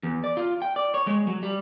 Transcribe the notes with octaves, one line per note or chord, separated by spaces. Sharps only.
E2
D5
F4
G5
D5
C#5
G#3
F#3
G3